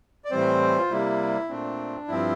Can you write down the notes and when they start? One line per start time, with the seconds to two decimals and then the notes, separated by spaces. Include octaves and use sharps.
0.25 D5
0.31 A2 E3 G3 C4 C5
0.78 F4
0.90 C3 G3 A#3 E4
1.49 A#2 A3 C4 D4
2.08 G2 F3 C4 E4